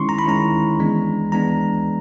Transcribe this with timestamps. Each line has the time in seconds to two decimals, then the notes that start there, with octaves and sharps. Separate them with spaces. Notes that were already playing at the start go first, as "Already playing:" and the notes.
Already playing: D#3 G#3 C#4 E4 C6 C#6
0.09 A#5
0.19 B5
0.26 D#3 G#3 C#4 E4 A#5
0.79 E3 G#3 B3 D4
1.32 E3 G#3 B3 D4 A#5